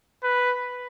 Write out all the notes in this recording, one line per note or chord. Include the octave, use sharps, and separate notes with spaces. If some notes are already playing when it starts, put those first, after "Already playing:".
B4